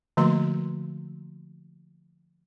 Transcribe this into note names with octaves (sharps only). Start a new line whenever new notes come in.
D3 F3 A3 A#3 F#4 C6